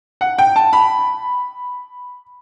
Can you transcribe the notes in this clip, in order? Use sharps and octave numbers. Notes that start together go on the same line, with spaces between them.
F#5
G5
A5
B5